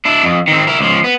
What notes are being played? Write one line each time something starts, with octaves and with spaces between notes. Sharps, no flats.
D4 E4
F2
D#3 C4
E4 A#4
C#2 F3
B3